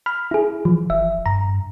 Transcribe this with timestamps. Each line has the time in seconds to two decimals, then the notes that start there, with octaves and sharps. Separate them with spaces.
0.06 B5 F6
0.31 E4 G#4
0.65 E3 F3
0.90 F#1 E5
1.26 G2 A#5